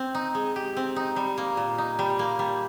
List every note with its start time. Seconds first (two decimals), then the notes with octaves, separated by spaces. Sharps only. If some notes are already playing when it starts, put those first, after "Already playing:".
Already playing: C4
0.15 D#4
0.35 G#3
0.56 G4
0.77 C4
0.96 D#4
1.16 G3
1.38 A#3
1.57 A#2
1.78 D#4
1.99 G3
2.19 A#3
2.39 G3